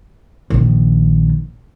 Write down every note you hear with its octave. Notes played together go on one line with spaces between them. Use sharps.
A#1 D#3